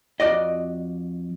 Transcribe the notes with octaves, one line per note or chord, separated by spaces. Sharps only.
F2 F#4 D5 D#5